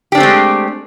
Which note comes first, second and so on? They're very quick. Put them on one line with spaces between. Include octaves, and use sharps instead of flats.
G4 D4 C4 A3 G#3